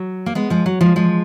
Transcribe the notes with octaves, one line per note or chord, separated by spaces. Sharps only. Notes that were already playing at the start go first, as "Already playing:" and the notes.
Already playing: F#3
A#3
G#3 B3
F3 G#3
F#3
F3 G#3
F3 G#3